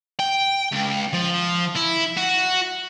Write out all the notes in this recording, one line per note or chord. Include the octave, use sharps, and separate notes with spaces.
G5
C#2
F3
E4
F#4